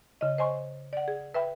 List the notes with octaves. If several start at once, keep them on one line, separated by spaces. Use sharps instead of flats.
C#3 D#5
C5 D#5 G#5 C6 C#6
D5 F#5
G#4
B4 E5 G5 B5